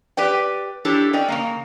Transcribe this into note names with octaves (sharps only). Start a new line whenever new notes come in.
G4 B4 D5 G5
D4 E4 G4 A4 C#5
C#4 D5 D#5 G5
C#3 F3 A#3